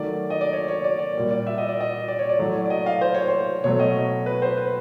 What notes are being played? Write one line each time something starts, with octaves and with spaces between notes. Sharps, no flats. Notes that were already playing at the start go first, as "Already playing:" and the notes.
Already playing: D#3 F#3 A3 D5
D#5
D5
C#5
C#5
D5
D5
A#2 G3 A#3
D5
E5
D#5
D5
D#5
D5
C#5
D5
A2 F#3 A3
D5
D#5
F5
C5
C#5
C5
B2 F#3 A3 C#5
D#5
B4
C5
B4